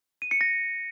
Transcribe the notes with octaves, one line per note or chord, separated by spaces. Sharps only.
D#7
C#7
A#6